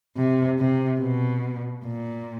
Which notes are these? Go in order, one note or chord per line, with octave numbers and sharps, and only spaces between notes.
C3
C3
B2
A#2